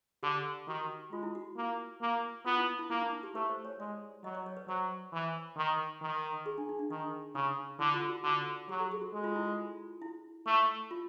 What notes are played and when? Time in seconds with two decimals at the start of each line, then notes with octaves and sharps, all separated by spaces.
0.23 D3 G4
0.67 D#3 F#4
1.12 G#3 F4
1.23 E4
1.35 F#4
1.57 A#3
2.01 A#3
2.46 B3 F4
2.57 E4
2.79 E4
2.90 A#3 E4
3.01 D#4
3.12 D#4
3.23 G4
3.35 A3 B4
3.49 C5
3.65 C#5
3.79 G#3 D5
4.23 F#3 D#5
4.35 D5
4.46 C#5
4.57 B4
4.68 F#3 C5
5.13 E3
5.57 D#3
6.02 D#3
6.46 G#4
6.58 D4
6.69 D#4
6.79 D4
6.90 D#3 D#4
7.35 C#3 D#4
7.79 D3 E4
7.94 F4
8.09 F#4
8.24 D3 F#4
8.69 F#3 G4
8.80 A4
8.92 G#4
9.01 F#4
9.13 G#3
9.24 F4
9.36 E4
9.46 F4
10.02 E4
10.47 A3
10.91 F4